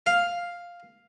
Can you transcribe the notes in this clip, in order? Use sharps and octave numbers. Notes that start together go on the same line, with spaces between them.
F5